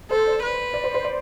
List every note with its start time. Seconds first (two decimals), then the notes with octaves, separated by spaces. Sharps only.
0.11 A4 C5
0.27 D5
0.42 B4
0.74 D5
0.84 C5
0.94 C5
1.04 D5